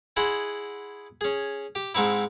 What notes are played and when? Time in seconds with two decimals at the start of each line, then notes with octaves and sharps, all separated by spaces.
0.16 E4 G#4 D#5 F#5 G#5 C6
1.21 C#4 G#4
1.75 G4
1.94 G#2 C4 D#4 E4